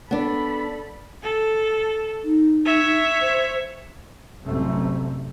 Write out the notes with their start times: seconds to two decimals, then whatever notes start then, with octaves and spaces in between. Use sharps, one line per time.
0.11 B3 D4 A4 B5
1.23 A4
2.24 D#4
2.65 C#5 E5
3.21 C5
4.43 A1 F#2 C3 G3 A3 C4